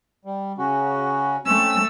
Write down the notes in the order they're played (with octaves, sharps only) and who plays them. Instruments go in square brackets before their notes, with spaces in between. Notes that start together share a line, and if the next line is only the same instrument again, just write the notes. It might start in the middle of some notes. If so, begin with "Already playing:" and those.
[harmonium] G3
C#3 C#4 F#4
[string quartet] A3 E6 [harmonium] C4 C#4